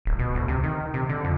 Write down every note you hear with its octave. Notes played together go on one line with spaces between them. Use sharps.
D1
B2
D2
C3
D#3
C3
D3
F2